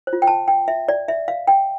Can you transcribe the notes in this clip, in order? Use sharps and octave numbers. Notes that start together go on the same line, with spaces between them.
C5
F4
G5
A5
G5
E5
D5
E5
F5
G5